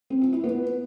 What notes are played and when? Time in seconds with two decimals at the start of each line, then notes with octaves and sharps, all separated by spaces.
0.10 C4
0.21 F4
0.33 E4
0.44 B3